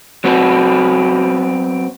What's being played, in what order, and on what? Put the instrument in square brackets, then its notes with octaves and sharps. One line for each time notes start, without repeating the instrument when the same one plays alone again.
[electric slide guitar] F#3 B3 C4 F#4